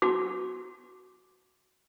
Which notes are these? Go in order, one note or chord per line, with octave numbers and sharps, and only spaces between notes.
F#4 D6